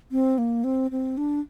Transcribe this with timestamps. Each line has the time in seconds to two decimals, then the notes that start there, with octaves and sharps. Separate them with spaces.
0.11 C4
0.38 A#3
0.64 C4
0.91 C4
1.17 D4